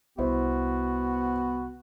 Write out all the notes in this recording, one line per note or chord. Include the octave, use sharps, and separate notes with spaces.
C2 B3 E4 F#4 C5